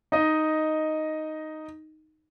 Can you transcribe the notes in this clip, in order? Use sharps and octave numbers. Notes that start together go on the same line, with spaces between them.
D#4 D#5